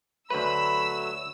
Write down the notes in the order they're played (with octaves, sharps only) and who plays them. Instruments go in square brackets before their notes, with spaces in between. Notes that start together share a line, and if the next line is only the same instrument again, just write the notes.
[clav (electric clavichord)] D2 B4 [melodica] F#3 A3 [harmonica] B5 [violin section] E6